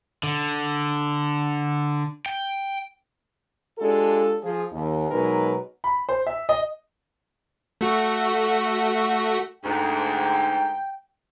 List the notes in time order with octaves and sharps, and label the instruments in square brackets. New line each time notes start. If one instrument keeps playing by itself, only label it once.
[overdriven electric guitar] D3
G5
[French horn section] G#3 D4 F4 G4 A4
F3 G#4
D#2
B2 F#3 G#3 D#4 A#4 B4
[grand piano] B5
C5
E5
D#5
[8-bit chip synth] A3 F#4
[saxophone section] D2 G#2 [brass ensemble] G5